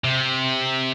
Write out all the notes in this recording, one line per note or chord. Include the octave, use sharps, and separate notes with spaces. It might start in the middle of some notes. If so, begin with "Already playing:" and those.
C3